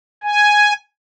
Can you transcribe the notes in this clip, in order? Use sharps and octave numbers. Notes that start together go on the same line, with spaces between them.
G#5